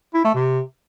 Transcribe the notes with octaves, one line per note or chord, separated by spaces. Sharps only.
E4
A3
C3